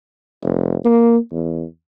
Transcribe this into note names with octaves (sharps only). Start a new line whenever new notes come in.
F1
A#3
E2